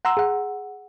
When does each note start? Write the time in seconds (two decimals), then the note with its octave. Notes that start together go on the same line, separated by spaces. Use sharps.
0.05 F#5 A#5 C6 E6
0.17 G#4 F#5